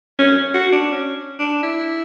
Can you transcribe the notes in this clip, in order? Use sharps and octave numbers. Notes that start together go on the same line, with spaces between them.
C#4
F#4
D4
C#4
D4
E4